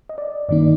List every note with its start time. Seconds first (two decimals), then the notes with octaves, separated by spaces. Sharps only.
0.09 D#5
0.18 D5
0.49 G2 D#3 A#3 D#4 D5